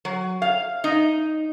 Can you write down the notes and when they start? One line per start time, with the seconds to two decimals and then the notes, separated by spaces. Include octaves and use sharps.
0.05 F#3
0.42 F5
0.84 D#4